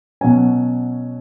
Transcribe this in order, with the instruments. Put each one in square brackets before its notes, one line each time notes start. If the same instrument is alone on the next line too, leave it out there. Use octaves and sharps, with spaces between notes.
[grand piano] B2 F#3 C#4 G#5